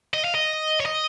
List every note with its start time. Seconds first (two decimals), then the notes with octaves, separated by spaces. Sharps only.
0.14 D#5
0.24 F5
0.35 D#5
0.80 C#5
0.86 D#5